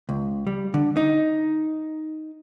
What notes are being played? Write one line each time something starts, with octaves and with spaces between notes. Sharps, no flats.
C#2
G3
D3
D#4